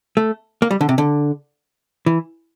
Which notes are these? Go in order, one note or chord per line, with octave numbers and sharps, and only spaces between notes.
A3
A#3
G3
D3
C3
D3
E3